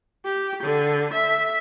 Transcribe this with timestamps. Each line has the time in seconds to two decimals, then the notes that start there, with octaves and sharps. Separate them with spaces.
0.25 G4
0.63 D3
1.13 E5